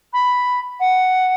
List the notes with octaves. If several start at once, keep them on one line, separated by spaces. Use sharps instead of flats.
B5
F#5